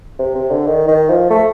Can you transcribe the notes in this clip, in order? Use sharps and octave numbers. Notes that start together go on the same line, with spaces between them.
C3
C3
D3
D#3
D#3
F3
A3